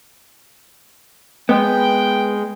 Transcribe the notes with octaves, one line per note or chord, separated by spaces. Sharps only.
G#3 B3 B4 G5